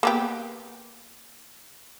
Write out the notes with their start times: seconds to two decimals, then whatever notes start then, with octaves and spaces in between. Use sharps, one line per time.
0.03 A#3 B3 G4